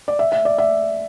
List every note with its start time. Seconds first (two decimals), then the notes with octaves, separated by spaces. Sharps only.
0.08 D5
0.19 E5
0.32 E5
0.45 D5
0.58 E5